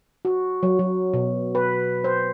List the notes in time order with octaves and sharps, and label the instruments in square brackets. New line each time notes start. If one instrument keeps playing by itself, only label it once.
[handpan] F#4
F#3
F#3
B2
B4
C5